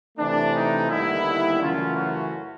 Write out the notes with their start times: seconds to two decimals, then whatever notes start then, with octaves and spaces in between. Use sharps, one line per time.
0.18 C3 E3 A3 D4
0.53 D#4
0.88 D#2 D3 G3 B3 E4
1.59 F#2 C#3 E3 A3 C#4 F4
1.95 F#4